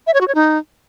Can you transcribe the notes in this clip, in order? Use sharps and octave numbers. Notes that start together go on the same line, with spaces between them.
E5
C#5
F#4
C#5
D#4